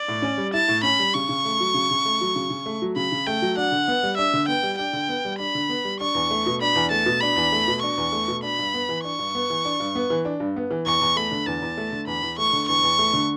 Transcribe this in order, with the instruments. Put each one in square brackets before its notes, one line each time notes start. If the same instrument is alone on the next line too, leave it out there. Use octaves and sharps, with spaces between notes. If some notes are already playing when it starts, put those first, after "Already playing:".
Already playing: [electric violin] D5
[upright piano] A2
C#4
G3
[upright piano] E4 [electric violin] A5
[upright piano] A2
[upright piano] C#4 [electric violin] B5
[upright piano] G3
[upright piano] C#3 [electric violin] C#6
[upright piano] C#3
A3
F#3
C#3
C#3
A3
F#3
C#3
C#3
A3
F#3
[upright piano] C#3 [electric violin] B5
[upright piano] C#3
[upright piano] A3 [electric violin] G5
[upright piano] F#3
[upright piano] D4 [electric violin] F#5
[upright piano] D3
B3
G3
[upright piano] D4 [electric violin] E5
[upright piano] D3
[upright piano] B3 [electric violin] G5
[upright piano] G3
[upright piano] D4 [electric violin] G5
[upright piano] D3
B3
G3
[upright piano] D4 [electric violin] B5
[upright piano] D3
B3
G3
[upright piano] D4 [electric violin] C#6
[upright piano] E2
A3
B2
[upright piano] D4 [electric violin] B5
[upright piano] E2
[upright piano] A3 [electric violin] A5
[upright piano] B2
[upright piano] D4 [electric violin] B5
[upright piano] E2
A3
B2
[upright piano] D4 [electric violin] C#6
[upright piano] E2
A3
B2
[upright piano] D4 [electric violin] B5
[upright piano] G2
B3
E3
[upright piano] D4 [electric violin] C#6
[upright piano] G2
B3
E3
D4
G2
B3
E3
D4
G2
B3
E3
[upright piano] E2 [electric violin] C#6
[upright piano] E2
[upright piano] A3 [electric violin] B5
[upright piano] D3
[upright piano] E2 [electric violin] A5
[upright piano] E2
A3
D3
[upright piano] E2 [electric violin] B5
[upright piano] E2
[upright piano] A3 [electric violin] C#6
[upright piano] D3
[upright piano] E2 [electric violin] C#6
[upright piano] E2
A3
D3